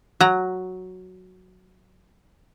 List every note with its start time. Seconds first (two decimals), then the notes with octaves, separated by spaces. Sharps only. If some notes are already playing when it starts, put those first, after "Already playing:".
0.21 F#3 A#5